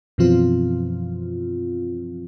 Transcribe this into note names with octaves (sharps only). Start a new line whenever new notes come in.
F#2 B2 E3 F3 C4 F4